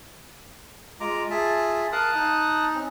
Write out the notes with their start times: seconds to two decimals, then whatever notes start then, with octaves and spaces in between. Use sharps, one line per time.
1.00 G#3 F4 A#5 D6
1.30 G#4 E5 A5
1.92 A#4 F5 A5 D#6 F#6
2.14 D#4
2.75 C4 C#4